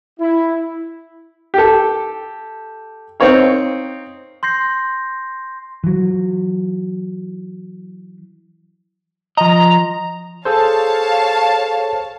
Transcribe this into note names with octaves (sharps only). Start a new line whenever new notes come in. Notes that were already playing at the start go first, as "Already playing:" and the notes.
E4
G4 A4
C4 D#4 C#5 F5
C6 G6 A#6 C7
E3 F#3
F3 D#5 A#5
G#4 A4 C5 C#5 F5 A5